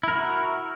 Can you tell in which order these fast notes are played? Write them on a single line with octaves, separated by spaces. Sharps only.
E4 A#4 F#4